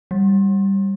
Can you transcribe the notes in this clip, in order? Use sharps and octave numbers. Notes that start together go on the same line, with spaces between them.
G3